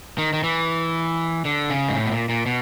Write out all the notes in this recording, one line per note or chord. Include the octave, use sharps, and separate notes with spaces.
D#3
D#3
E3
D3
C#3
G#2
A2
B2
A#2
A#2
B2